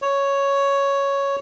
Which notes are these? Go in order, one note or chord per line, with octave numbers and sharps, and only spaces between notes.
C#5